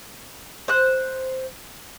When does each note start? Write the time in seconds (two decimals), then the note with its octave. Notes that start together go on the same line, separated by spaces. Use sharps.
0.68 C5 F#6